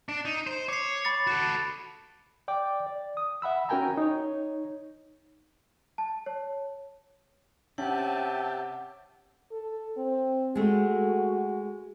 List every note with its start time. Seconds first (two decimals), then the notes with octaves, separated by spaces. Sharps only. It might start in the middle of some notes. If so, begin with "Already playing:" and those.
0.09 D4
0.25 D#4
0.47 C5
0.68 C#5 D6 C7
1.05 B5 D6 A6
1.27 F#4 A4
2.48 D5 G5 D6
2.87 D5
3.17 D#6
3.42 E5 F#5 B5 E6
3.69 C#4 F#4 A#4 G5 G#5 A#5
3.97 D#4 C#5
5.98 A5
6.26 C#5
7.78 C3 C#4 E5 F#5 G5 A5 D6
9.51 A4
9.97 C4
10.55 G#3 A3 F#4